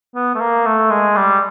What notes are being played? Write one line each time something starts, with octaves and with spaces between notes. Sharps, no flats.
B3
A3
A#3
A3
G#3
G3